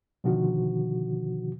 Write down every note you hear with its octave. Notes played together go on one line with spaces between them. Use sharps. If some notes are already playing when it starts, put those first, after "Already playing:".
B2 D3 D#3 F3 F#4